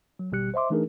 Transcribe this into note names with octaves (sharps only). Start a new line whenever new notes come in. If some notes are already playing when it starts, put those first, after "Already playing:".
F#3
G#1 B2 G3 G4 F#6 C#7
C5 D#5 E5 C6 D6
E3 A3 D4 D#4 G#4 A#4